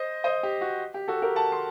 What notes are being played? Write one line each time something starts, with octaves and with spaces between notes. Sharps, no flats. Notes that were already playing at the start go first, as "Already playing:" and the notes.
Already playing: C5 D#5
C5 D#5
G4
F#4
G4
F#4 A4
G4 A#4
F#5 A5
C6